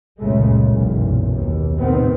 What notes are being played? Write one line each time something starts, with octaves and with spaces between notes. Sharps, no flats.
F#1 C#2 A#2 C#3 G#3 A3
F#1 B1 E2 A#2
D#2 B2
A2 C3 D#3 B3 C4